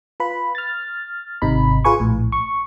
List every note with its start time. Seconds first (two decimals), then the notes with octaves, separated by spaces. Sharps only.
0.20 F4 B4 B5
0.55 F6 A6
1.42 G#1 C3 D#4 B5
1.84 F4 G#4 B4 G#5 C#6
2.00 A#1 A2
2.32 C#6